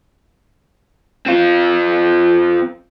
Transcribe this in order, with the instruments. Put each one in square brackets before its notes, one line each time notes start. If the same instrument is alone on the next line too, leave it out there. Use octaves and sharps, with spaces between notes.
[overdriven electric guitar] C4 F4